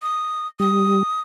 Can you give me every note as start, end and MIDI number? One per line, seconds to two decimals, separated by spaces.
0.02 0.47 87
0.60 1.03 55
0.60 1.21 87